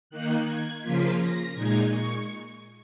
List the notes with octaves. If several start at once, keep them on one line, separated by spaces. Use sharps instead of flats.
D#3 A#3 D#4 F#6
G#6
C#3 F3 A#3 F4 B6
A#6
A#2 G#3 D#4 G#6
C#6